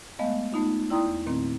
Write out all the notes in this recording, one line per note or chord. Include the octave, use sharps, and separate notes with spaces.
G#3 A3 B3 D#5 F5
A3 B3 D#4 F4
E4 D5 G5 A#5 C6 D#6
E2
A#2 D#3 A3 A#3 C4